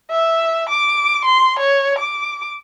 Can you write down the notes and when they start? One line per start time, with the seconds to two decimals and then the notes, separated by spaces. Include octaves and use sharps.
0.11 E5
0.69 D6
1.25 C6
1.59 C#5
1.98 D6